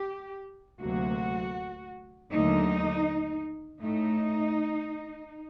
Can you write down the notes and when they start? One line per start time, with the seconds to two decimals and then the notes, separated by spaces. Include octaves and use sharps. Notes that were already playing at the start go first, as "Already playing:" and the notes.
Already playing: G4
0.80 D2 C3 F#3 A#3 F#4
2.30 D#2 D3 F#3 A3 D#4
3.81 A2 A3 D#4